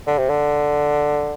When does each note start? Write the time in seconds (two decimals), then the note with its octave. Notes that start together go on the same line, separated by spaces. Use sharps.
0.07 D3
0.19 C3
0.30 D3